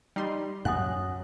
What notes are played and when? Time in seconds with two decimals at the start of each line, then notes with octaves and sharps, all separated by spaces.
0.16 G3 D#4 C6
0.65 F#2 F#5 D#6 F#6